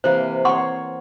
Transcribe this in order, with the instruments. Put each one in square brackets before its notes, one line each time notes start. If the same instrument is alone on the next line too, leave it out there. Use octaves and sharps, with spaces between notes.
[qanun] C3 E3 A#3 [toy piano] C5
[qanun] C4 C#5 [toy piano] F#5 C6 C#6